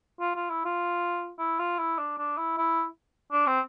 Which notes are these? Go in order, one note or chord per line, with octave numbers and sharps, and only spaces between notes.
F4
F4
E4
F4
E4
F4
E4
D4
D4
E4
E4
D4
C4